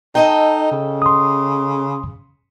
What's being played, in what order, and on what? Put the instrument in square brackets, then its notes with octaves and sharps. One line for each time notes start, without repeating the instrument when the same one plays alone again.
[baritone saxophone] D#4 [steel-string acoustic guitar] A4 D#5 G5
[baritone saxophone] C#3
[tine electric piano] C6 D#6